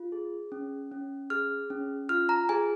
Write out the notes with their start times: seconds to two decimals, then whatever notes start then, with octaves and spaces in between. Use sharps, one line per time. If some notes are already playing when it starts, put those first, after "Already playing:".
Already playing: F4
0.12 G#4
0.52 C#4
0.92 C#4
1.30 G#4 F6
1.70 C#4
2.09 F4 F6
2.29 A#5
2.49 G#4 G#5